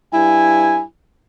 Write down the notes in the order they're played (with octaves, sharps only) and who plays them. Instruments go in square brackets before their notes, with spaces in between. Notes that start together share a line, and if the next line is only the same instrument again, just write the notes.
[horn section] G2 E4 G#5